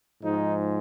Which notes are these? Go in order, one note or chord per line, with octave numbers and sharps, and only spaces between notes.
G#2 F3 G#3 D#4